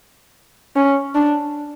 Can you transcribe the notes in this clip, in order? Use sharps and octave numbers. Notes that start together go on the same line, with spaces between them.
C#4
D4